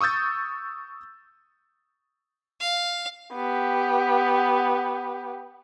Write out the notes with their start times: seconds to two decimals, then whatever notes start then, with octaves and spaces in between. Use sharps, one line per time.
0.01 C#6 D#6 E6 G6 A6
2.60 F5
3.34 B3 G4